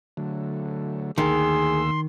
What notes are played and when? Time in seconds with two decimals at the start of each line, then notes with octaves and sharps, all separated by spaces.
0.17 D3 F#3 A3
1.18 D2 D#3 A#3 G#4 C6 E6